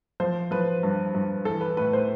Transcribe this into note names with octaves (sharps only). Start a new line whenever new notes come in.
F3 C5
F3 B4
G2
G2
E3 A4
B4
A2 B4
C5